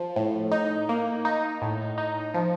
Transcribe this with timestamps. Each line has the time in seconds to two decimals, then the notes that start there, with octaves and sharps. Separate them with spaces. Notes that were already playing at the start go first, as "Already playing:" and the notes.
Already playing: F3
0.16 A2
0.52 D#4
0.89 A#3
1.25 D#4
1.62 A2
1.98 D#4
2.34 F3